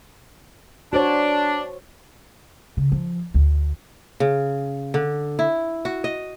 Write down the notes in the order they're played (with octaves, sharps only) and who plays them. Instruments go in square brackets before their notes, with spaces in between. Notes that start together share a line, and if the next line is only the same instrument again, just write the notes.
[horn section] D4 [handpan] F#4 C5 C#5
[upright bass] C#3
F3
D2
[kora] C#3
D3
E4
F#4
D#5